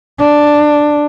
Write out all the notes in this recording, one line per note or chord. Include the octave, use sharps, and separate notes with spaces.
D4